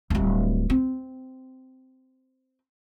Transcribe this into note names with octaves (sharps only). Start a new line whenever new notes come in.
D1 G3
C4